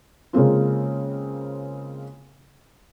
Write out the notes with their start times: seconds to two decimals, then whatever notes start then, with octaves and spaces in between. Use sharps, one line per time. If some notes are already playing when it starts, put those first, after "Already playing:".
0.33 C#3 G#3 A#3 C4 F4